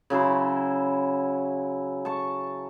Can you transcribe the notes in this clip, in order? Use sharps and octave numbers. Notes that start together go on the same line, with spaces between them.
C#3 F#3 E4 C6
A5 C#6